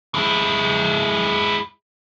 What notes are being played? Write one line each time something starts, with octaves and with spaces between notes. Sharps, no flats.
G#3 E4